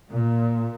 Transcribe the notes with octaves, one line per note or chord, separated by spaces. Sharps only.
A#2